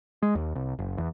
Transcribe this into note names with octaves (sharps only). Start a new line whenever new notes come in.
G#3
D#2
C2
F#1
E2